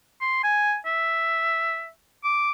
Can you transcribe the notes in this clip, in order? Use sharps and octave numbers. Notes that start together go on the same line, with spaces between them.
C6
G#5
E5
D6